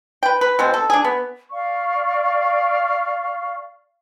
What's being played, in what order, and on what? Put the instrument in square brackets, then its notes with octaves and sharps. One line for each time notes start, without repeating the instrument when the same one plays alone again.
[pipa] B4 G5
B4
B2 G#3 C4
A4
D4 G#4
B3
[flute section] D5 F5 C#6